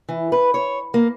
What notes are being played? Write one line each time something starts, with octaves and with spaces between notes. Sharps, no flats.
E3
B4
C#5
A#3